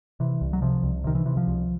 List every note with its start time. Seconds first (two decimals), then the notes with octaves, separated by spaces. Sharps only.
0.20 C3 E3
0.41 C2
0.53 F#3
0.62 C3 F3
0.83 C2
1.04 C3 D#3
1.15 E3
1.26 C3 E3
1.37 F3
1.47 C2